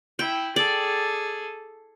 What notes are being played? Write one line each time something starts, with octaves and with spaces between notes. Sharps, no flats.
E4 G5
G#4 A4 D5